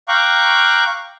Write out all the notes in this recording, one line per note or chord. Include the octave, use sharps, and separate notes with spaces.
F5 G5 A#5 C#6 D6 F#6